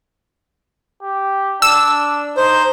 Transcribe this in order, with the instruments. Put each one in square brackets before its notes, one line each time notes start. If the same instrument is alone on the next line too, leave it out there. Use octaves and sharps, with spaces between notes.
[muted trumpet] G4
[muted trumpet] D4 [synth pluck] E6
[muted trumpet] D#4 [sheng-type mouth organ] C5